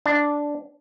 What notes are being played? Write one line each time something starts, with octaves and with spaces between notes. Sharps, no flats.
D4